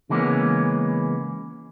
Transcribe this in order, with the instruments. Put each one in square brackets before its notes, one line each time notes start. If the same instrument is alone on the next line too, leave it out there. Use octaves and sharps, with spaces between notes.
[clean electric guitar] C#3 E3 G#3 A#3 B3 C#4